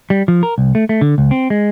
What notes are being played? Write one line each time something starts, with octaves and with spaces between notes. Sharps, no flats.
G3
F3
A#4
C2
A3
A3
D3
C#2
C4
G#3